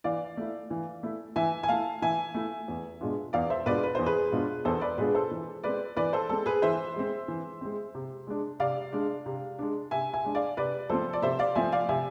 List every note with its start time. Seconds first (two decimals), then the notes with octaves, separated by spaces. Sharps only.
0.04 E3 D5 F5
0.37 A3 E4
0.70 E3
1.03 A3 E4
1.36 E3 E5 G#5
1.63 G#5
1.69 A3 E4 F5 A5
2.02 E3 E5 G#5
2.34 A3 E4
2.68 E2
3.01 B2 G#3 D4 F4
3.33 E2 D5 F5
3.50 C5 E5
3.66 B2 G#3 D4 F4 B4 D5
3.83 B4
3.95 E2 C5
4.06 G#4 B4
4.32 B2 G#3 D4 F4
4.65 E2 A4 C5
4.81 B4 D5
4.98 B2 G#3 D4 F4 G#4 B4
5.15 A4 C5
5.31 E3
5.64 G#3 C4 B4 D5
5.96 E3 B4 D5
6.13 A4 C5
6.29 G#3 C4 A4
6.46 G#4 B4
6.62 E3 C5 E5
6.96 G#3 C4
7.28 E3
7.61 G#3 C4
7.95 C3
8.27 G#3 D4
8.60 C3 D5 F5
8.93 G#3 D4
9.26 C3
9.59 G#3 D4
9.91 C3 E5 G#5
10.13 E5 G#5
10.24 G#3 D4
10.35 D5 F5
10.57 C3 B4 D5
10.89 F3 A3 C4 A4 C5
11.13 D5
11.22 C3 C5 E5
11.39 D5 F5
11.55 F3 A3 C4 E5 G#5
11.72 D5 F5
11.89 C3 E5 G#5